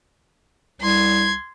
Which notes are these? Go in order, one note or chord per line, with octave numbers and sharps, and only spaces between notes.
C2 C6 G#6